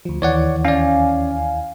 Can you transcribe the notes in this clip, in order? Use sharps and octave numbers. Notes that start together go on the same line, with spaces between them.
D2 F3
D#2 E3 C#5 D5 F#5
C#4 D5 F5 G#5